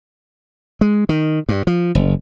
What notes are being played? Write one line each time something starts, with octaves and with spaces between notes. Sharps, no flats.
G#3
D#3
G2
F3
F#1